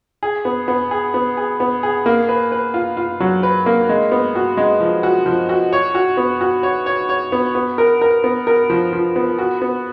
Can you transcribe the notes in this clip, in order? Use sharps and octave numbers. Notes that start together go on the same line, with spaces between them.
G#4
B3
B3
G#4
B3
G#4
B3
G#4
A#3
B4
B4
F4
F4
F#3
B4
A#3
G#3
B3
F#4
G#3
F3
F#4
F3
F#4
C#5
F#4
B3
F#4
C#5
C#5
C#5
B3
B3
A#4
A#4
B3
A#4
F3
F3
B3
F#4
B3